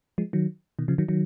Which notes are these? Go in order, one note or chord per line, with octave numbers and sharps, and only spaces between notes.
F3 G#3
D#3 F#3
B2 D#3
C#3 F3
D#3 F#3
D#3 F#3